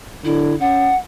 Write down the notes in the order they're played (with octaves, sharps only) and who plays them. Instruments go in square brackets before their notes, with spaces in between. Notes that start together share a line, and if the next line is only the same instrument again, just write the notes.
[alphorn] D3 [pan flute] E4
[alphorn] C#4 [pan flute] F#5